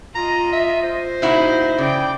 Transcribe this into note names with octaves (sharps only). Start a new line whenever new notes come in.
F4 D#5 A#5
E5
C5
A#2 D#4 E4 F#4
C#3 D5 G5